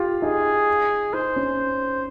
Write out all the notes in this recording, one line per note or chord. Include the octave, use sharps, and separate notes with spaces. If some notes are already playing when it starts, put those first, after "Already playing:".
Already playing: F4 G4
D#4 G#4
D#4 C5
C#4